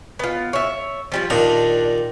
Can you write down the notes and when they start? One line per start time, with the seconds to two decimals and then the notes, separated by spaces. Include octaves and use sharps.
0.19 B3 F4
0.53 C#5 E5
1.12 F3 G3 F4
1.30 D#2 A#2 D4 D#4